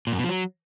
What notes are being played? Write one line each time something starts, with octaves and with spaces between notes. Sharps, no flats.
A#2
F#2
B2
F3
F#3